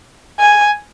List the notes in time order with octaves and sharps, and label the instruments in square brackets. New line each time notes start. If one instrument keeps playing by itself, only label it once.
[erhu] G#5